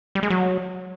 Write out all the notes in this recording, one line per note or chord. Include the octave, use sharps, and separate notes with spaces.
G3
G#3
F#3